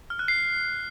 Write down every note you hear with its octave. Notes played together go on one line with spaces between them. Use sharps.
F6
F#6
C7